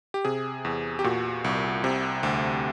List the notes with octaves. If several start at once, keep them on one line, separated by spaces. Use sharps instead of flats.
G4
C3 G#4
E2
G4
A#2 F#4
C2
C3
D2